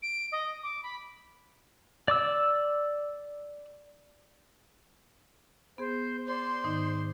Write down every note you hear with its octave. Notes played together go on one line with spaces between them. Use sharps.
D7
D#5
D6
B5
D5 D6 E6
B3 G#4 C5
C5 D5 C6
G#2 D#3 D#4